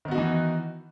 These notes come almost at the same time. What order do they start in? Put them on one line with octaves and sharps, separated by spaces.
D#3 B3 F#4 D#4 E3